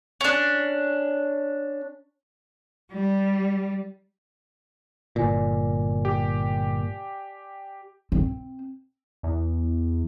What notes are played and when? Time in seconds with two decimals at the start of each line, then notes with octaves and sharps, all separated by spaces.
0.21 C#4 D4
2.93 G3
5.16 G1 A#2 D5 G#5
6.05 G4
8.12 C4
9.23 E2